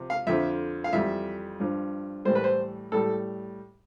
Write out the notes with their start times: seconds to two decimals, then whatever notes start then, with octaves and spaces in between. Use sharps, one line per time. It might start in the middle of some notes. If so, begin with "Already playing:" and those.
Already playing: C3 F3
0.10 F5
0.27 F2 D3 F3 E5
0.84 F5
0.93 F2 E3 G3 E5
1.60 G2 F3
2.25 A2 E3 G3 C5
2.35 B4
2.44 C5
2.92 A2 G3 A4